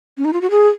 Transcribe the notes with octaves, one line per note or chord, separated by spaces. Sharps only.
C#4
D#4
F4
F#4
G#4